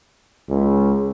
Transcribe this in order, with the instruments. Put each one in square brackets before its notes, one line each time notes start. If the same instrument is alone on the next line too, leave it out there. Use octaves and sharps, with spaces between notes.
[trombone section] C#2